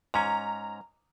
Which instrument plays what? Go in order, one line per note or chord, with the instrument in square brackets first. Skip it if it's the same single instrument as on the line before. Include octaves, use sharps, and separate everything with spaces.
[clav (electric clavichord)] G#2 C#4 [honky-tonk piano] A#5